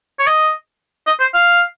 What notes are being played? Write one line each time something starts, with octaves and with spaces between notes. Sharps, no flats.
C#5
D#5
D#5
C5
F5